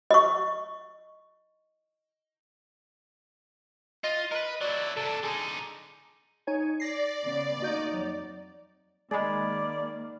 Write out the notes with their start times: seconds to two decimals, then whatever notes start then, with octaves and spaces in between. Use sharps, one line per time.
0.11 D#5 C#6
4.04 F4 D#5
4.31 A#4 B4 D#5
4.61 F#3 E4 D5
4.97 C3 D4 A4
5.23 D3 D#4 G#4
6.47 D#4 C#5 G#5
6.80 D5 A#6 C7
7.23 C#3 B3
7.60 D2 A#3 D#4 F#4 D#5 G6
7.94 F2 F#3 D5
9.11 D#3 G#3 A#3 D5 B5 G#6 A6